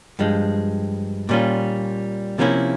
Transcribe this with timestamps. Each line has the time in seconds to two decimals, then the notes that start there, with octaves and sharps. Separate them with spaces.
0.19 G2 F3 G#3
1.29 A#2 G3 C#4 F4
2.38 C3 F3 A#3 C#4 E4